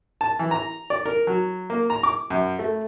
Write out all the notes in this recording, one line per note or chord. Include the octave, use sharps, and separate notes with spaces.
A5
E3
A#5
D5
A#4
F#3
A#3
A#5
D6
F#2
A3